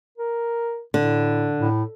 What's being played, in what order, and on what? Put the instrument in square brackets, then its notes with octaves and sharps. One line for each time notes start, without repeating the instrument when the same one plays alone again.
[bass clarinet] A#4
[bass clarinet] A2 [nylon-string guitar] D3
[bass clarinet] A2